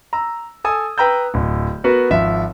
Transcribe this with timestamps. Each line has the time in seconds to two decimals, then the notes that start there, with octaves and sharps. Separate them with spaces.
0.13 A#5 E6
0.64 A4 G#5 D#6 E6
0.98 B4 G5 A#5 E6 G6
1.34 D1
1.84 B3 F#4 A#4 B4
2.10 G#1 F3 E5 E6